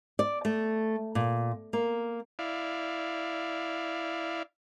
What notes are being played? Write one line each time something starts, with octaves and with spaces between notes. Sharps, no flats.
D5
A3
A#2
A#3
E4 D5 F5